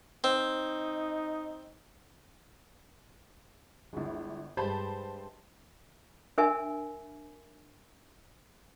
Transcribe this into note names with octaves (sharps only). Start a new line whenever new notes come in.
C4 D#4
G1 D2 G#3 E4
G2 G#3 G4 C5 A5 B5
D4 A#4 E5 G#5